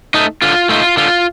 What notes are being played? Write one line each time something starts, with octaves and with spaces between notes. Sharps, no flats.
A3 D#4
D3 F4
A3 D#4 F4
D3 F4